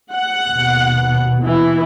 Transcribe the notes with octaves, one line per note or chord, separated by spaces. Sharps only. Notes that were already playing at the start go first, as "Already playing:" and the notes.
F#5
D#2 B2
E3 E4